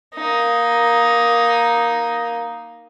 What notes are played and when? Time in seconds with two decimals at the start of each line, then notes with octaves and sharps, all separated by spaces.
0.15 A#3 D#4